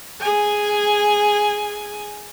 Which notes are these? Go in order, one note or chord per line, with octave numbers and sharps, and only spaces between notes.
G#4 G#5